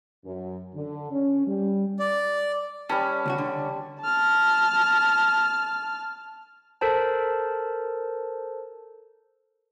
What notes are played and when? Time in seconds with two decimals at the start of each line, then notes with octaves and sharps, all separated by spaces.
0.24 F#2
0.75 D3
1.11 C#4
1.46 G3
2.00 D5
2.89 G3 C#4 B4 A5
3.26 D2 C#3 F#4
3.38 D3
4.01 A5 F6
6.81 A4 A#4 C5 A5